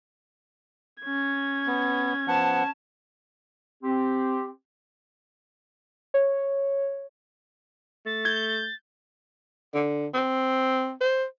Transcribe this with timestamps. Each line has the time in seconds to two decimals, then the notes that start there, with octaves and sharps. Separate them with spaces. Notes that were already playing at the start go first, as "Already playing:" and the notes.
1.03 C#4 G#6
1.67 B3
2.28 F3 B3 F#5 A5
3.83 C4 G4
6.14 C#5
8.06 A3 A6
8.25 G6 G#6
9.75 D3
10.14 C4
11.01 C5